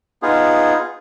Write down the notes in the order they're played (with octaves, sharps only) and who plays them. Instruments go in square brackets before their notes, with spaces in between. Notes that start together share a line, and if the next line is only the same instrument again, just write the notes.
[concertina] B3 D#4 F4 G#4